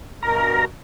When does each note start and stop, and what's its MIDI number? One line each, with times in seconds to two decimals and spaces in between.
0.23 0.65 43
0.23 0.65 47
0.23 0.65 70
0.23 0.65 82